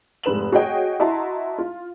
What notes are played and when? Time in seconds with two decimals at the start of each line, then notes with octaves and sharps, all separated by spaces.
0.23 F1 G#2 B4 E7 F#7
0.52 F#4 G#4 C#5 D#5 G5
1.00 E4 F#4 D#5 A5 A#5 C6
1.58 F4